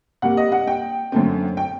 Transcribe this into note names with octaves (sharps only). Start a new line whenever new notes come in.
C3 G3 A#3 F#5
D#5
F#5
G5
F#2 D3 A3 C4
G5